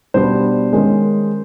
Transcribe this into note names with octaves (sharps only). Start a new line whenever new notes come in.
B2 G3 B3 D4 C5
D#3 G#3 C#4